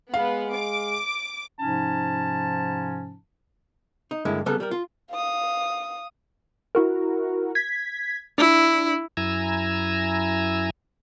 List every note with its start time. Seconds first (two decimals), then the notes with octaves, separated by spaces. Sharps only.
0.14 G#3 B3 F5
0.53 D6
1.58 G#2 C3 F3 C#4 D#4 A5
4.11 D#4
4.25 G2 D3 G#3 A#3 E4
4.46 C#3 G3 B3 A4 A#4
4.60 G3 A#4
4.71 F4
5.11 F5 D#6
6.75 E4 F#4 A#4
7.55 G#6 B6
8.38 D4 E4
9.17 F#2 E4 G#5 A#5 E6